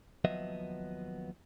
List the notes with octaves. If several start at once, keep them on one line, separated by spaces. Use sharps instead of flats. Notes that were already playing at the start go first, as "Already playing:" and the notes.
D#2 F3 F#3 B3 D#5 E5